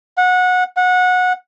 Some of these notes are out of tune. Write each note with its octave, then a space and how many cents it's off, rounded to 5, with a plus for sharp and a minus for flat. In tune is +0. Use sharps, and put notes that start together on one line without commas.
F#5 -20
F#5 -20